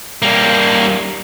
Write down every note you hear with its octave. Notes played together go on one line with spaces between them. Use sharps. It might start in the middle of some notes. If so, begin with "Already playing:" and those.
G3 A#3